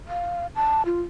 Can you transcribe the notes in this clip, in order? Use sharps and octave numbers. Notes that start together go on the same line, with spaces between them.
F5
A5
F4